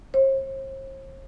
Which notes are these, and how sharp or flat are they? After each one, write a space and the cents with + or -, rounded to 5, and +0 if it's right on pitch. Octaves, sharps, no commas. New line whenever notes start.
C5 +45